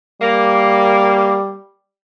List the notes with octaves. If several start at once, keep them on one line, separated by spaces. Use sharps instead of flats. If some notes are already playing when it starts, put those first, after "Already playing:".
G3 A#3